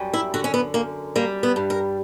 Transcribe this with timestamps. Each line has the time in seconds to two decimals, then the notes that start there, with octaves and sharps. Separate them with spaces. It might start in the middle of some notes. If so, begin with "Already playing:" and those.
Already playing: F#2 G3
0.13 E4
0.34 D3 F#4
0.44 C#4
0.54 B3
0.74 F#2 A#3
1.16 G3 A#3
1.43 B3
1.56 G2
1.70 A#4